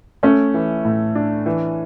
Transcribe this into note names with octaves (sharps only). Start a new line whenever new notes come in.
A3 C#4
E3
A2
D4
E3